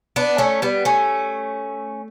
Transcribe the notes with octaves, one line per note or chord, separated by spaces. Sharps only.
B3 D4
A3 C#4
G3 B3
A3 C#4